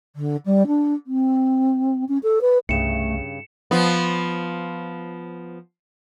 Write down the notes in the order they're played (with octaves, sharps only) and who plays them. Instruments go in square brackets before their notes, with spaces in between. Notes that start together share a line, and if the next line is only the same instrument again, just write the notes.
[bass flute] D3
G3
D4
C4
C#4
A4
B4
[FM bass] C2 [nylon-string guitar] G2 C#3 [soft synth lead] A3 [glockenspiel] C#7 E7
[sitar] F3 B3